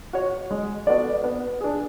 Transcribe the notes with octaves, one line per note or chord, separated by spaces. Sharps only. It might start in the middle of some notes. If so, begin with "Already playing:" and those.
F#4 C#5
G#3
B3 F#4 A4 D5
B3
D4 G#4